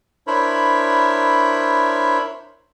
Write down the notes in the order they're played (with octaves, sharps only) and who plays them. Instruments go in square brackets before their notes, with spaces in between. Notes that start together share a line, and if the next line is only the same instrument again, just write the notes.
[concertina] D4 E4 A#4 C5 C#5 B5